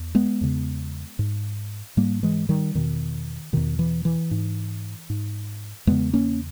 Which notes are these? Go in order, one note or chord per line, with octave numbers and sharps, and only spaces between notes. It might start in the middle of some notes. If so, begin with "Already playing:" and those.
Already playing: E2
G#3 B3
E2 C#3
G#2
G#2 G3 A#3
E3 G#3
D#3 G3
E2 B2 D#3
E2 B2 D#3
E3
E3
G#2
G#2
E2 C#3 G#3 B3
A#3 C#4